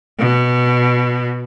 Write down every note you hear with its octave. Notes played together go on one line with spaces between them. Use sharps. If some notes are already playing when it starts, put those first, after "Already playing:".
B2